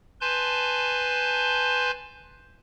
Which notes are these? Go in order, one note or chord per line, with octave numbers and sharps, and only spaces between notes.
B4 G#5 A5 C6 G6